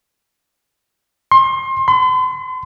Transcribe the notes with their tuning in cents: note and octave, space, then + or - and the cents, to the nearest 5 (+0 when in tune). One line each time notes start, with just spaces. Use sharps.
C6 +30
C6 -45